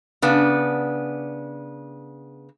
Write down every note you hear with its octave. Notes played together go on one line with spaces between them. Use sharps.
C#3 B3 D4